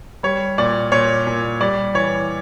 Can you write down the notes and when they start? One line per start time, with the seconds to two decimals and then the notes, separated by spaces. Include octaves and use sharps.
0.23 G3 C#5
0.58 A#2 D5
0.92 A#2 C#5
1.27 A#2
1.61 G3 D5
1.94 E3 C#5